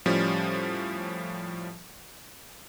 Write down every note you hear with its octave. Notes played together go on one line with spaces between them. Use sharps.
A2 F3 G3 C#4